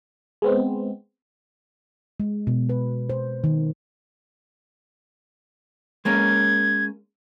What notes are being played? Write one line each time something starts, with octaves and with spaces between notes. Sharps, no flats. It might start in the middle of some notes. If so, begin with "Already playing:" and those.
G#3 B3 C4
G#3
B2
B4
C5
D#3
G#3 A#3 C#4 G#6